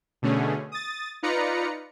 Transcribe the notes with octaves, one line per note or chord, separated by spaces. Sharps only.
B2 D3 A3 C#4 G#4
D#6 A6
D#4 F4 B4 D5 A#5 C#7